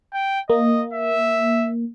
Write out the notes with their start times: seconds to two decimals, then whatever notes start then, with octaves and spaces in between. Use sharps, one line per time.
0.14 G5
0.50 A#3 D#5
0.93 E5